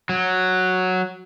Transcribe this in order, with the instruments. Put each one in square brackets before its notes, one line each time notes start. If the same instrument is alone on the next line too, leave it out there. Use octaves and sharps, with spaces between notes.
[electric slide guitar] F#3